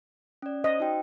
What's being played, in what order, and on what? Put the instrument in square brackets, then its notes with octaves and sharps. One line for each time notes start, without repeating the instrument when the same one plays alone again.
[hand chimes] C#4 D5
[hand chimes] C5 [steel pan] D#5
[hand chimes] D#4 F#4 G5